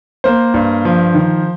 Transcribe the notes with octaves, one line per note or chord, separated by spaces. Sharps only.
A#3 C5
G2
F3
D#3